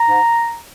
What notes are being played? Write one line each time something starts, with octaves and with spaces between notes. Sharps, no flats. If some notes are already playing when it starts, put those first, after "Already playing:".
Already playing: A#5
G#2